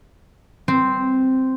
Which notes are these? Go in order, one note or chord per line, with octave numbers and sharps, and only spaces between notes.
C4